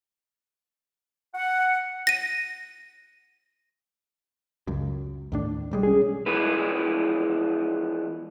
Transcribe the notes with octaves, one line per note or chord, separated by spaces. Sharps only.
F#5
A#6 D#7
C#2 F#2
D#2 A2 D4
B1 G3 G#3
C#4 G#4
E3 F3 G#3 B3 E4 B4